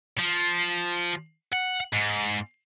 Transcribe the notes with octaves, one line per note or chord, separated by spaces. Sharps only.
F3
F#5
G#2